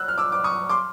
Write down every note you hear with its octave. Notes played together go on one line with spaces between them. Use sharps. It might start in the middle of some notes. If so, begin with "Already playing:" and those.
Already playing: E6 F#6
F6
D6 E6
D6
C#6 D#6
C6 D6